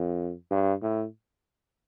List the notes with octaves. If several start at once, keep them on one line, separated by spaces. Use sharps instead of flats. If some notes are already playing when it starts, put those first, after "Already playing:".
Already playing: F2
G2
A2